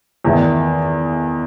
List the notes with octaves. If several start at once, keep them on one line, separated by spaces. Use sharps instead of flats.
E2 D#3 A3